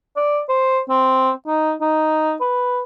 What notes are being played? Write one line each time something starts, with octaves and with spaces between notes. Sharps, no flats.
D5
C5
C4
D#4
D#4
B4